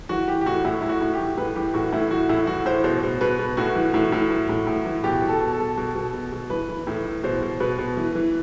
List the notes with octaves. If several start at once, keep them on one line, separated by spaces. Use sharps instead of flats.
E3 F#4
E3 G4
G4
A2 F#4
A2 E4
A2 E4
F#4
A2
G4
E3
A2 B4
E3 G4
A2 F#4
A2 E4
E3 F#4
A2 E4
E4
E3 F#4
A2 C5
B2 C5
B2
B2 B4
B2
A2 F#4
E3
A2
A2
E3
A2
A2
E3
B2 G4
B2
A4
B2
A4
B2
B2
B2
B2
B2
E3 B4
E3
A2
E3
B2 C5
B2
B2 B4
B2
E3
E3